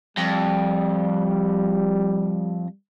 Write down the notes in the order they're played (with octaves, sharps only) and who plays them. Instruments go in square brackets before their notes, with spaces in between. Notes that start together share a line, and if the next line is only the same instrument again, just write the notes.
[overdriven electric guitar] F2 [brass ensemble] G3